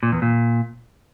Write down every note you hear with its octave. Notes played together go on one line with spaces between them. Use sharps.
A#2
E2
A#2